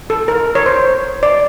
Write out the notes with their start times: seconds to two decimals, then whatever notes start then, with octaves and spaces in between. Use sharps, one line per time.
0.10 A4
0.28 A#4
0.55 C#5
0.66 C5
1.23 D5